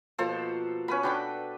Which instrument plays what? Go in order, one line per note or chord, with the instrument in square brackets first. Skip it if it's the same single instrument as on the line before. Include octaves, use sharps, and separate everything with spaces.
[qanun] B2 F3 A#3 [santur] A4 C5
[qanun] B3 [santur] C#4 B4 B5
[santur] D4 G5 B5 [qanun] F#4 A4 D5